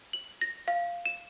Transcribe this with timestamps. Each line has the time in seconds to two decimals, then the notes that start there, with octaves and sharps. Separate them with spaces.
0.13 F#7
0.41 A#6
0.68 F5
1.06 E7